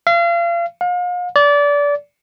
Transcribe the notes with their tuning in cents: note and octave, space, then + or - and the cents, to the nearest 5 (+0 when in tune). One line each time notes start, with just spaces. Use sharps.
F5 -35
F5 +40
D5 -25